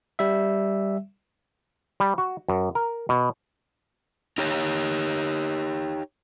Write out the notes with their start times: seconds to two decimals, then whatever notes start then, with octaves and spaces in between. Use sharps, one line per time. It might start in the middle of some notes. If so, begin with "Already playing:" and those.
0.19 G3 E5
2.00 G3
2.18 F#4
2.49 F#2
2.75 A#4
3.09 B2
4.38 D#4 G4 C#5